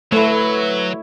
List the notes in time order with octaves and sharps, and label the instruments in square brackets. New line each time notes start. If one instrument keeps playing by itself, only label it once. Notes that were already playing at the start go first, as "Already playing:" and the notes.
[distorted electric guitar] F#3 [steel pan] A3 [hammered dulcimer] E4 C#5 [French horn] B4